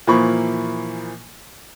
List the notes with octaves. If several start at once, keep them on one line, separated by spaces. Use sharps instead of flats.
A#2 E3 F3 A#3 B5 C#6